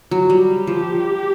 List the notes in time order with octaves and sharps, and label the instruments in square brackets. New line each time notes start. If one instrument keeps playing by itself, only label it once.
[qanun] F#3
[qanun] G3 [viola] G4
[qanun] F3